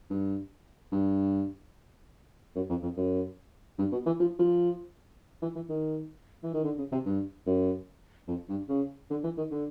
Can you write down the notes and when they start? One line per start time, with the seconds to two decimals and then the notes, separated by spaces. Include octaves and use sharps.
0.10 G2
0.92 G2
2.56 F#2
2.69 F2
2.83 F2
2.97 F#2
3.78 G2
3.92 B2
4.06 E3
4.20 F3
4.39 F3
5.42 E3
5.55 E3
5.69 D#3
6.43 E3
6.54 D#3
6.64 D3
6.78 C#3
6.92 C3
7.06 G2
7.46 F#2
8.28 F2
8.49 G2
8.69 C#3
9.10 D3
9.24 E3
9.37 D#3
9.51 D3